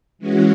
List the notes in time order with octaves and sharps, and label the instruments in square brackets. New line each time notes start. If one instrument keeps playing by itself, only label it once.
[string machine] E3 G#3 C#4 F#4